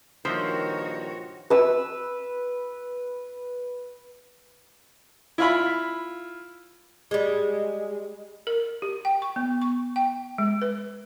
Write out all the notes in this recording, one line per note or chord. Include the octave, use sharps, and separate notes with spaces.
G2 A#2 D#3 F3 F#4 C5 C#5 E5
B4 E6
E4 F4 B5
G3 G#3
A#4
G4
G5
C#6
B3
C#6
G5
G#3
B4